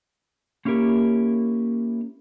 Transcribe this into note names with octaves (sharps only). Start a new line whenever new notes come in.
A#3 C#4 E4 G4 A#4